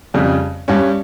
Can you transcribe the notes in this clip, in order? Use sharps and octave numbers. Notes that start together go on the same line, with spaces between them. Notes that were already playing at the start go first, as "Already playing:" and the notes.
F2 C#3 G3
G2 G3 C#4